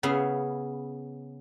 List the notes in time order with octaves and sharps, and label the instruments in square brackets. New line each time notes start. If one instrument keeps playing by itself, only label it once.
[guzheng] C#3 B3 E4 G#4 F5